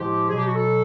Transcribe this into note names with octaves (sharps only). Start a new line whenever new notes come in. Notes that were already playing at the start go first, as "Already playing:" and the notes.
Already playing: A2 F3 G#3 G4
B2 F#3 G#4
G4
F#4
A4